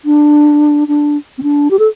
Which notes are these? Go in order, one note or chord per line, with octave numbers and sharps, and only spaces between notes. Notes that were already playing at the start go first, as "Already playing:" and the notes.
D4
D4
C4
D4
G4
A4